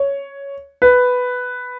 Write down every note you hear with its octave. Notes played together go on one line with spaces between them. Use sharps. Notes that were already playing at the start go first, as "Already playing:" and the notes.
Already playing: C#5
B4